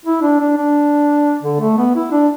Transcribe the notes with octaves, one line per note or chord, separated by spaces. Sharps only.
E4
D4
D4
D4
D3
A3
B3
E4
D4